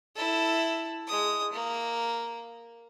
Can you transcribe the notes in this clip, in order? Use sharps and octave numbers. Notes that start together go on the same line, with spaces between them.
E4 A4
G#3 D#6
A#3